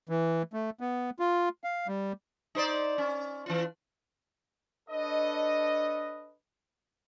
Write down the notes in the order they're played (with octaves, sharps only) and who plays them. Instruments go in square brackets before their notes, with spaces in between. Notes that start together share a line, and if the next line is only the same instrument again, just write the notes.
[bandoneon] E3
A3
B3
F4
F5
G3
[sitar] D#4 C5 D5
C#4
E3 F4
[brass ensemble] D4 A4 B4 C#5 D#5